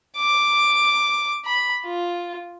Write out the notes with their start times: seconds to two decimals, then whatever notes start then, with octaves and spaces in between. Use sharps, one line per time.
0.18 D6
1.45 B5
1.85 F4